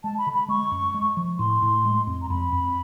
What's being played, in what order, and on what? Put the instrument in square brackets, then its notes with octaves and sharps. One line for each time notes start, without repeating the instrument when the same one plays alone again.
[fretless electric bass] G#3 [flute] A5
[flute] B5
[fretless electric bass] D3
[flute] B5
[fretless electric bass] G#3 [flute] C#6
[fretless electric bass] F#2
G#3
F3
[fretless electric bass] A2 [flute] C6
[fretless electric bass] A2
G#3
F2
[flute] A#5
[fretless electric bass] F2 [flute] B5
[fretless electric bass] F2